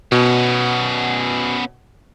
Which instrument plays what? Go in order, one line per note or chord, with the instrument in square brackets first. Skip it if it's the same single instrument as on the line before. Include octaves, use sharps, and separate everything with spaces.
[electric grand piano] B2 [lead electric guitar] B3 C#4